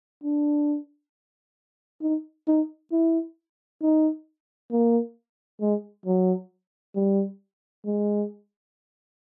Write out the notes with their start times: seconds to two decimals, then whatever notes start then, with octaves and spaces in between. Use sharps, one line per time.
0.24 D4
2.02 D#4
2.48 D#4
2.92 E4
3.82 D#4
4.71 A#3
5.61 G#3
6.06 F#3
6.95 G3
7.86 G#3